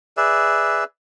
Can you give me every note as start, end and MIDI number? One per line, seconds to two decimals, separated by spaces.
0.17 0.84 68
0.17 0.84 71
0.17 0.84 74
0.17 0.84 76